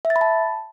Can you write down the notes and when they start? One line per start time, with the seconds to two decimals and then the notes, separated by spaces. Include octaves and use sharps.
0.05 E5
0.10 A6
0.16 B5
0.21 A5